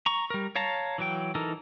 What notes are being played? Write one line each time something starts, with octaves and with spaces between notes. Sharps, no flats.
A#5 C#6
G3 A#4
C#5 F5 A5 A#5
E3 F#3 G5
E3 D#4 A4 A#4